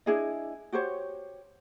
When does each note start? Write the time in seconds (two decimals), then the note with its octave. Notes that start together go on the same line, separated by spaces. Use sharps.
0.06 D4 E4 G#4 D#5
0.73 F#4 G4 C5 C#5